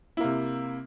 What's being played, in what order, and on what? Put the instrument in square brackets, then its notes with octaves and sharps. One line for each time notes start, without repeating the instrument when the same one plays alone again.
[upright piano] E4
A#3
C3